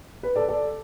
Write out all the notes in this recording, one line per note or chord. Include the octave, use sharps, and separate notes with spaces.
B4
A4 D5
A4 D5